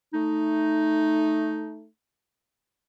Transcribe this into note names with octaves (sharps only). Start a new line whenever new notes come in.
A3 D#4